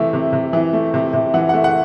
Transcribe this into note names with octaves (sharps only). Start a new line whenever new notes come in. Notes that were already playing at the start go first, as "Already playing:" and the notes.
Already playing: C3 E3 A3 E5
C3
C3
E3
A3
C3
C3
E3 F#5
A3 F#5
F#5